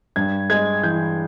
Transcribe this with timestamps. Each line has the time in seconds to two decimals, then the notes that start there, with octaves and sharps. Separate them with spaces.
0.16 G2 G#6
0.50 G#3 G#6
0.83 E3 G6